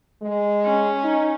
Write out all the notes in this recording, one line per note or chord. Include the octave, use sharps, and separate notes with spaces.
G#3
C#4
D#4